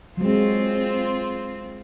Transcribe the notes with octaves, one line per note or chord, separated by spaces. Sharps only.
F#3 G#3 C4 F4